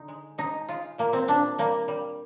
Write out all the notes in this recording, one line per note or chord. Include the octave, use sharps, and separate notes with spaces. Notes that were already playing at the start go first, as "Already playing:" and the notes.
Already playing: D3 D#4
G#3
G#3 D#4
G#3 F4
A#2 A#3
C4
A#2 D4
G3 A#3
G3